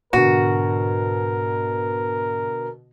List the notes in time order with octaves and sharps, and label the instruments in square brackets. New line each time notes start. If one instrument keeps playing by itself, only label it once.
[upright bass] G#2 [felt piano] B2 D3 [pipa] F#4 [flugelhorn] A#4